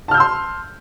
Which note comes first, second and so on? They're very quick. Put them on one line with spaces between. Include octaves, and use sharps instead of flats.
A5 F6 G6 E6 C6